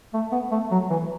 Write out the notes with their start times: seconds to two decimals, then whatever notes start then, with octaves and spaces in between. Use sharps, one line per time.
0.13 A3
0.32 B3
0.51 A3
0.71 F#3
0.90 E3